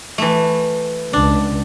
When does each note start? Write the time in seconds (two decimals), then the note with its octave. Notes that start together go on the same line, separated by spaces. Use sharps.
0.18 E3 A3
1.13 C#2 D4